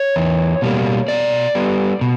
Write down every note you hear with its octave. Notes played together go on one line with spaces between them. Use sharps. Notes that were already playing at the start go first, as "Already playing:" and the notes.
Already playing: C#5
E2
B2 G3 A#3
B2 D5
G3 B3
B2